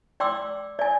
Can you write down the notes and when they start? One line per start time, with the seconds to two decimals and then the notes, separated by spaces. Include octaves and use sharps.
0.20 D5 G5 C6 D6 E6
0.79 D5 G#5